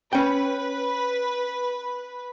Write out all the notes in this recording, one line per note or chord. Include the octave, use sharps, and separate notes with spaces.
C#4 B4 G5